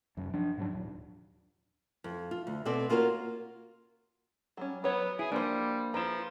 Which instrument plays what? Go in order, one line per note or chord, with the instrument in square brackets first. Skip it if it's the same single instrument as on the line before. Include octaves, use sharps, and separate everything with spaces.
[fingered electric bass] F1 F#2
F3 D4
G#2 F#3 D4
D#1
[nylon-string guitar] F2
F4
D2
B2 B3 C4 A4 D5
A#3 F4 F#4 A#4 C#5
[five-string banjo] F#3 G3 C#4
[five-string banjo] F#3 C#5 [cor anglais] B3 [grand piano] B4
[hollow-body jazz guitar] E4 [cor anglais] G#4
[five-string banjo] F3 [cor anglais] G3 [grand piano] A#3 [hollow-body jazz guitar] D4 C5
[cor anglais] F3 [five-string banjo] E4 G#4 B4 [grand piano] A#5 D7 E7